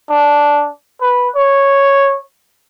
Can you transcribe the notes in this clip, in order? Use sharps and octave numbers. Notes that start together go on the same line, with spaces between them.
D4
B4
C#5